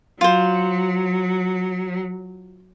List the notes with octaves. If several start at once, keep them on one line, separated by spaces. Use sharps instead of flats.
F#3 F4 C5